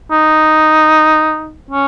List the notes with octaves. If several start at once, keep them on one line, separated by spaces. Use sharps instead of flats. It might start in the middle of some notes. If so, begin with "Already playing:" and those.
D#4
C#4